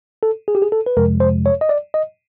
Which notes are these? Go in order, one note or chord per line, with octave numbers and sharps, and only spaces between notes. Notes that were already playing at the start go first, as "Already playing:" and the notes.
A4
G#4
G4
G#4
A4
B4
F2 C3 F3 G#3 A#4
C5
C#5
D#5
D5
D#5